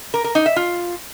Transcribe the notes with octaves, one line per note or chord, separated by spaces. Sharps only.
A#4
A#4
D#4
E5
F4